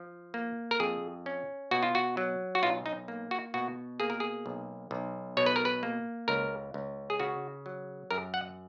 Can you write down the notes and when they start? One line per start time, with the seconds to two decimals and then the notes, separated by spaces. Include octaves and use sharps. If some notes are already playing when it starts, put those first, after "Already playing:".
Already playing: F3
0.34 A#3
0.71 A#4
0.80 F2 G#4
1.26 C#4
1.71 B2 F#4
1.83 F4
1.95 F#4
2.17 F#3
2.55 F#4
2.63 B1 F4
2.86 D#4
3.08 A#3
3.31 F#4
3.54 B2 F#4
4.00 A#3 G#4
4.10 A#4
4.20 G#4
4.46 B1
4.91 B1
5.37 B2 C#5
5.46 B4
5.56 A#4
5.65 B4
5.83 A#3
6.28 C#2 A#4
6.74 C#2
7.10 G#4
7.20 C#3 F#4
7.66 F#3
8.11 F#2 A#4
8.34 F#5